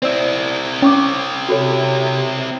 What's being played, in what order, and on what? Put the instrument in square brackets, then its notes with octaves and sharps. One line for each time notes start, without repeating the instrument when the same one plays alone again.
[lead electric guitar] C4 E4 [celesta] C5 D5 E6
[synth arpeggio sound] C#4 [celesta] G5 C#6 D6
[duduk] C3 [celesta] F#4 A4 C#5